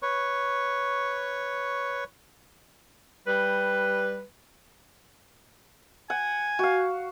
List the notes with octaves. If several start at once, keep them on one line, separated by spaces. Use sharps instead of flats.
B4 C#5 C#6
G3 B4
F#5 G#5
F#4 F5